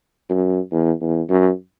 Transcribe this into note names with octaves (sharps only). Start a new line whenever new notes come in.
F#2
E2
E2
F#2